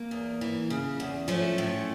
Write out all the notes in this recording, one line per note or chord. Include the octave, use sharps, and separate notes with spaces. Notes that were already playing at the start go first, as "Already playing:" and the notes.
Already playing: A#3
E2
E3
C#3
E2
F3 A3 C#4
A2